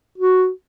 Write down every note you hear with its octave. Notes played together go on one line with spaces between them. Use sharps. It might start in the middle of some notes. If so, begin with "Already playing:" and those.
F#4